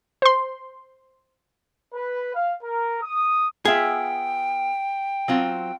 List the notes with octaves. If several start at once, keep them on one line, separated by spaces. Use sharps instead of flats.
C5 C6
B4
F5
A#4
D#6
B3 F4 G#4 E5 G5
F#3 C4 F4